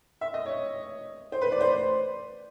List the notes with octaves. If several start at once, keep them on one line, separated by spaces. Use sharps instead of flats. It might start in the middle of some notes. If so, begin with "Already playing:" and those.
E5
D#5
C#5
C5
B4
D5
C5